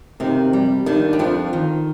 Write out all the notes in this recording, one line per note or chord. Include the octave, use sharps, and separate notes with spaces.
D#2 C3 D#3
G3
D#2 D#3 D4
G3
F2 F3 F4
D#3